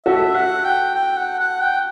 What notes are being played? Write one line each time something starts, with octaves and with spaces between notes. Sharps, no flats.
F#4 A4 E5
F#5
G5
G5
F#5
F#5
G5